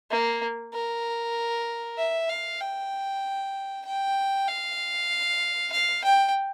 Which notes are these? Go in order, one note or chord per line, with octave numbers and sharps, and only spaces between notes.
A#3
A#4
E5
F5
G5
G5
F5
F5
G5